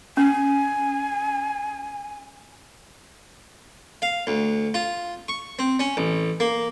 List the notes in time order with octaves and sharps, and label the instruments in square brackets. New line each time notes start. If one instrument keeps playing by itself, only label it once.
[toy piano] C#4 [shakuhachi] G#5
[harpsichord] F5
D2
F4
C#6
C4
C#4
A1
A#3